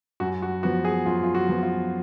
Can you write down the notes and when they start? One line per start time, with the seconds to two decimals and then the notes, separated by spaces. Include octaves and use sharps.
0.20 F#2 F#4
0.42 F#4
0.63 F3 B3 F#4
0.85 G#4
1.06 F#2 F4
1.24 F4
1.35 F#4
1.49 F3 B3
1.63 F4